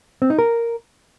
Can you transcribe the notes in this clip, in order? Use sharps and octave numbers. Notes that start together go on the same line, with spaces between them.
C4
D#4
A#4